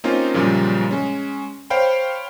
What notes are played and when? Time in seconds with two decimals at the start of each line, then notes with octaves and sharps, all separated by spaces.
0.04 A#3 C4 C#4 D#4 F4
0.34 F#2 A#2 C#3 F3 G3
0.91 G#3 C#4
1.70 C5 C#5 F5 G5 B5